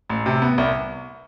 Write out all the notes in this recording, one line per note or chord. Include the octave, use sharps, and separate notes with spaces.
A1
C3
B3
C2